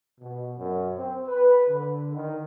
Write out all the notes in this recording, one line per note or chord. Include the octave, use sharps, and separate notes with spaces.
B2
F#2
C4
B4
D3
D#3